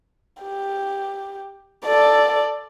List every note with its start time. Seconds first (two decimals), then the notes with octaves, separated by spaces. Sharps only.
0.42 G4
1.85 A4 D5